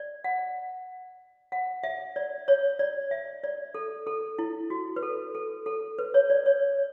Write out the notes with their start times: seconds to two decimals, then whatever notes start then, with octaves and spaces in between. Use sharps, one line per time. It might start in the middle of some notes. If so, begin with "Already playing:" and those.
Already playing: D5
0.24 F#5
1.52 F#5
1.83 E5
2.16 D5
2.48 C#5
2.79 D5
3.11 E5
3.44 D5
3.75 A4
4.07 A4
4.39 E4
4.70 F#4
4.96 B4
5.03 A4
5.35 A4
5.66 A4
5.99 B4
6.14 C#5
6.30 D5
6.46 C#5